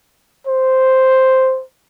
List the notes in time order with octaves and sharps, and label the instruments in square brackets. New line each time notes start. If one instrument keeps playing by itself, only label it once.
[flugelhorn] C5